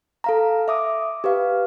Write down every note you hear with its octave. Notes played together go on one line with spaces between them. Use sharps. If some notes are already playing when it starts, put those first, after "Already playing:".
A4 F5 A#5
E5 D6 D#6
G4 B4 F5